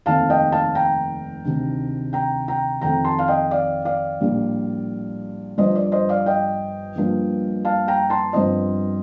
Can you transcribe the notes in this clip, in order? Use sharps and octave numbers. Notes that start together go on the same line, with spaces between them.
F1 D#2 D#3 A3 C4 F5 A5
D#5 G5
F5 A5
G5 A#5
D2 C3 D#3
G5 A#5
G5 A#5
F2 D#3 A3 C4 G5 A#5
A5 C6
F5
D#5 G5
D5 F5
D5 F5
A#1 A2 G3 A#3
G1 G2 F3 C5 D#5
D5
C5 D#5
D5 F5
D#5 G5
G1 G2 F3 A#3
F5 A5
G5 A#5
A5 C6
G1 G2 F3 C4 C5 D#5